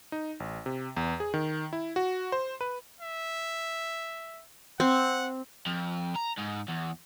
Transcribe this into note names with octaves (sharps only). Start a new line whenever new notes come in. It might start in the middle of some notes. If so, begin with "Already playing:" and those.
D#4
A1
C3
E2
G#4
D#3
E4
F#4
C5
B4
E5
C4 F#5
F2
A#5
G#2
E2